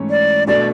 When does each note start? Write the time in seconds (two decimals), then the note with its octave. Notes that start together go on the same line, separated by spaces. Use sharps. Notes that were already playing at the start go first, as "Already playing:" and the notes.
Already playing: G#2 E3 A3 C#4
0.10 D5
0.47 B2 A3 D4 D5